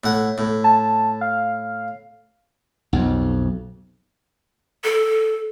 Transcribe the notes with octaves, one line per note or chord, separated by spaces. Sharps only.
A2 F#5
A2
A5
F5
B1 F2
A4